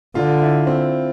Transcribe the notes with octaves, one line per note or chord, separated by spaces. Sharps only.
D3 F4
E4
C4